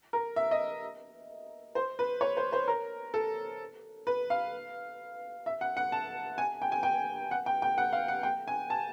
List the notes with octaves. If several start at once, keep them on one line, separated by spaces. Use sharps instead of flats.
A#4
E5
D#5
C5
B4
C#5
C5
C5
A#4
A4
B4
F5
E5
F#5
F#5
A5
G#5
G5
G#5
G5
F#5
G5
G5
F#5
F5
F#5
G5
G#5
A5